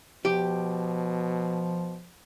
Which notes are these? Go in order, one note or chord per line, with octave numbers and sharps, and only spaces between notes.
B2 F3 G4